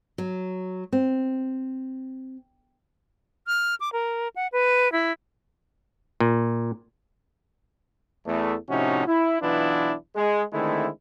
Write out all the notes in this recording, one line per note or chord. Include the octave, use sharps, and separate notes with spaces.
F#3
C4
F6
D6
A#4
F#5
B4
E4
A#2
E2 A3
A2 C3 F3 C#4 D#4 F#4
E4
B1 E3 B3 D4 E4 F4
G#3
D3 D#3 G#3 A3 C4 E4